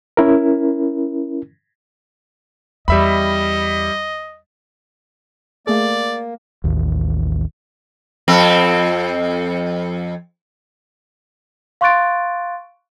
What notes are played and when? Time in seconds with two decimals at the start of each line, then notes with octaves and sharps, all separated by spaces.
0.17 C#4 E4 A#4
2.88 E2 G3 D#5 E5 B5
5.67 A3 A#3 G#4 D5
6.64 A1 D#2
8.28 F2 C4
11.81 F5 C6 C#6 F#6 A6 D7